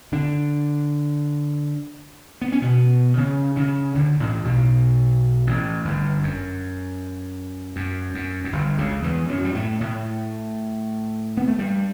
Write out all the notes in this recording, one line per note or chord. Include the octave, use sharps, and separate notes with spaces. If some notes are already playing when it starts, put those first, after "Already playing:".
D3 D4
B3
C#4
B2 B3
C#3 C#4
C#3 C#4
D2 D3
A1 A2
B1 B2
A1 A2
G1 G2
F#2
F#2
F#2
F#2
G1 G2
C#2 C#3
E2 E3
F#2 F#3
G3
A2 A3
A2 A3
B3
A3
G2 G3